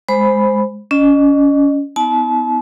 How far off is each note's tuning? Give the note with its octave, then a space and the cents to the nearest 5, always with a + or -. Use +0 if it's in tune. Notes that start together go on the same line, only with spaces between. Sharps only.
G#3 +0 C5 +0 B5 +0
C#4 +30 D#5 -30
B3 +15 D#4 +45 A5 -35